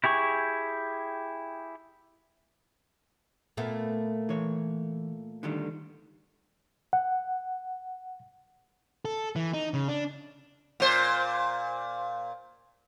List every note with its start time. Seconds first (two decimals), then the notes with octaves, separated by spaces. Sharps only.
0.04 E4 G4 G#4 C#6
3.57 A#2 A3 B3
4.29 E3 C#5
5.43 D3 D#3 G3
6.93 F#5
9.05 A4
9.36 E3
9.53 D#4
9.74 C#3
9.88 D4
10.80 A#2 C5